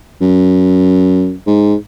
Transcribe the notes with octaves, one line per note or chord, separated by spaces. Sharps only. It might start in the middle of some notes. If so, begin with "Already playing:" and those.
F#2
G#2